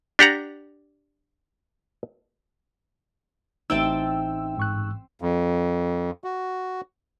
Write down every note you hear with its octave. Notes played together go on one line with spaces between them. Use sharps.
D4 G4 F#5 A#5
A1 C4 D#4 E5 G5 A5 E6
G#2 C#6 F#6
F2
F#4